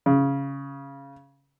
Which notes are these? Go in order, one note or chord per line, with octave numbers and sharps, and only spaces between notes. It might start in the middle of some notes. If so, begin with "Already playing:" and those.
C#3